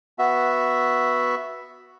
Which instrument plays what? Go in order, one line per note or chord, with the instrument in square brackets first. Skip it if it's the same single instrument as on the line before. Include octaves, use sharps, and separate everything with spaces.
[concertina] B3 F#4 E5